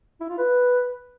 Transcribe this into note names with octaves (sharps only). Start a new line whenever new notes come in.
E4
F4
B4